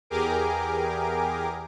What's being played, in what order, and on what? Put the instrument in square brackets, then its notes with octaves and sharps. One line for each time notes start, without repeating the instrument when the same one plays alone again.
[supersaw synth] E2 G4 G#4 A#4 D6